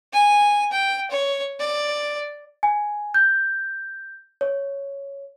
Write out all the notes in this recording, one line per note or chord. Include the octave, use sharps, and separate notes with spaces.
G#5
G5
C#5
D5
G#5
G6
C#5